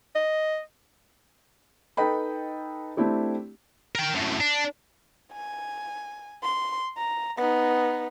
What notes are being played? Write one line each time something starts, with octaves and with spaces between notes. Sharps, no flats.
D#5
D#4 A4 B4 D#5 G5 B5
A3 C4 D4 E4 G4
A#4 G5
F#2 A2
D4
G#5
C6
A#5
B3 D#4